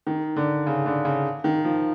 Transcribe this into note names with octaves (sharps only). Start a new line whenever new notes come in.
D#3
D3
C#3
D3
C#3
D#3
F3